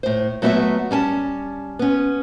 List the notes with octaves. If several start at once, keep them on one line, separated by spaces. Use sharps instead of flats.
A2 C5
F#3 A3 B3 F#4 B4 E5
G3 C#4 G#5 A5
B3 C#4